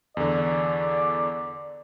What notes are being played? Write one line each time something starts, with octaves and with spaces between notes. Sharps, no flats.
E2 D3 D5